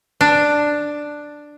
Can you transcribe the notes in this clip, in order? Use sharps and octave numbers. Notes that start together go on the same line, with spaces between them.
D4